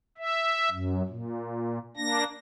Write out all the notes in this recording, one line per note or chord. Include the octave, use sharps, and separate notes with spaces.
E5
F#2
A#2
A#3 D4 A#6